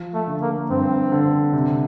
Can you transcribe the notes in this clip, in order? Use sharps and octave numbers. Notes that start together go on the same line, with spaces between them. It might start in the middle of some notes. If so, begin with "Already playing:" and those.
Already playing: F3
A3
D3
A#3
G2 C4
D3
C3